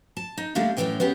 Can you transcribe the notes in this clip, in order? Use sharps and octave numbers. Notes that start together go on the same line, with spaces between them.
A5
D#4
D3 G3 A3 A#3 D4
F#2 A2 C3 E3 G5 G#5
B3 C#4 G4 G#4